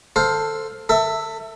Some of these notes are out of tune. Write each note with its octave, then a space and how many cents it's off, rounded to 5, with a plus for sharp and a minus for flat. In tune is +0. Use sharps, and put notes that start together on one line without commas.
A4 +10 C5 +0 F5 +15
A4 +30 E5 +0